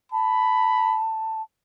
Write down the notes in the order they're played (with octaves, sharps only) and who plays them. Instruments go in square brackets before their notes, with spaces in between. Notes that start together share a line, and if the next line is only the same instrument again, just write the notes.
[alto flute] A5 [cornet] B5